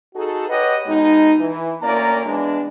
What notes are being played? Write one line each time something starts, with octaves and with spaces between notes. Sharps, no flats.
D#4 F#4 G#4 A4
G4 B4 C#5 D#5 F#5
B2 G#3 D#4
E3
D2 A#3 C#4 D5 A#5
E3 G#3 B3 D4